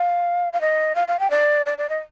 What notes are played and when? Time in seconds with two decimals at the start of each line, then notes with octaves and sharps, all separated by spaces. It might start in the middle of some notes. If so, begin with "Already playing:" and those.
Already playing: F5
0.53 F5
0.61 D#5
0.95 F5
1.08 F5
1.19 G5
1.30 D5
1.66 D5
1.78 D5
1.89 D#5